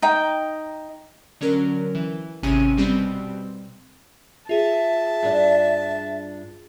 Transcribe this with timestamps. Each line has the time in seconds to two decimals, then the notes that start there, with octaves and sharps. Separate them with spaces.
0.02 D#4 G5
1.41 D3 F#3 C#4 A#4
1.95 E3
2.43 G#1 C3 C#4 G#5 D#7
2.77 B2 G3 C4
4.49 F4 G#4 E5 A5
5.23 G2 D4